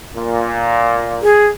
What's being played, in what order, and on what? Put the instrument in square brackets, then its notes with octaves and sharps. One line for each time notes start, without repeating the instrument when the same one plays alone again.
[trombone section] A#2
[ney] G#4